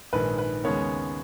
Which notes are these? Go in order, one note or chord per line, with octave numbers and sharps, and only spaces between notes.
A#1 G#2 D#3 B4
B4
D#2 C#3 G#3 B3 C#4 C#5